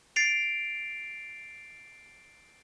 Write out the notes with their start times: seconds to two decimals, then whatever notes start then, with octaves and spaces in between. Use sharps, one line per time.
0.16 A6 C7 D7 F7